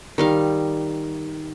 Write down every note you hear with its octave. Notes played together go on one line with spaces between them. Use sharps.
D#3 G3 F5